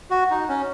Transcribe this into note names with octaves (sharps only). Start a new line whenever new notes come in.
F#4
D#4
C#4